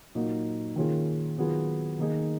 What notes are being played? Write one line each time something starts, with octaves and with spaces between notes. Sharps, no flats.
A#2 F#3 A#3 D#4 F#4
D#3 A#3 C#4 F4 G#4
D#3 F#3 B3 F4 G#4
D#3 A#3 D#4 G#4